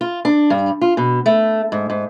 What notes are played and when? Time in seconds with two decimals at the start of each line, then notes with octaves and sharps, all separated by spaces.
0.01 F4
0.25 D4
0.50 G2
0.81 F4
0.97 B2
1.26 A3
1.72 G#2
1.90 G#2